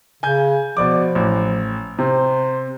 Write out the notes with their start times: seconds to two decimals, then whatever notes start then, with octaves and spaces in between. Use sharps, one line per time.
0.23 C#3 G#5 G6
0.77 B2 F3 D5 D6
1.15 A1
1.99 C3 C5